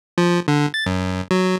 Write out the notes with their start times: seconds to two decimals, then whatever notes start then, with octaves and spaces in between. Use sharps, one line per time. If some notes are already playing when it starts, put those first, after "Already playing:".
0.18 F3
0.48 D3
0.74 A6
0.86 F#2
1.31 F#3